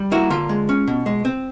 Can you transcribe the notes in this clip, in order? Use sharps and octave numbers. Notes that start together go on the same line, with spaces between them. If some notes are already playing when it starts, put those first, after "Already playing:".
Already playing: G3
A#3 E4 F#4
D3 F4
G#3
C#4
B2
G#3
C4